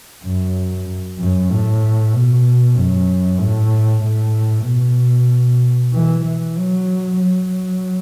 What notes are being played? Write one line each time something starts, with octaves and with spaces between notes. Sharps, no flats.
F#2
F#2
A2
B2
F#2
A2
A2
B2
E3
E3
F#3
F#3